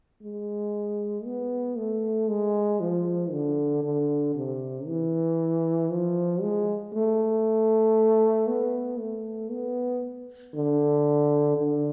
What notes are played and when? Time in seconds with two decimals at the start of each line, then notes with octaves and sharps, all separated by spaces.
0.22 G#3
1.25 B3
1.77 A3
2.28 G#3
2.80 F3
3.32 D3
3.83 D3
4.35 C3
4.86 E3
5.90 F3
6.42 G#3
6.93 A3
8.48 B3
8.99 A3
9.51 B3
10.54 D3
11.57 D3